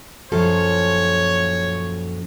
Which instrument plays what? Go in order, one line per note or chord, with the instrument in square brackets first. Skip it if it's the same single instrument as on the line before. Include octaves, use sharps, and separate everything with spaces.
[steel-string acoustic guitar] F#2 A#2 A4 [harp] F3 [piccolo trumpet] C#5